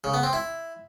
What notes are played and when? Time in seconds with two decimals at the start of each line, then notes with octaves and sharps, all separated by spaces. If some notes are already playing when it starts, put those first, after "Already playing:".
0.04 C#3
0.14 B3
0.23 C4
0.33 E4